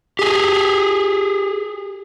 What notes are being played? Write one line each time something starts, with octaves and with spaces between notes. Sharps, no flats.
G4 G#4